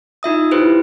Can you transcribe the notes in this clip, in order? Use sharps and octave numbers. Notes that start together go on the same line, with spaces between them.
D#4 F4 E5 D#6
E4 G4 B4 C5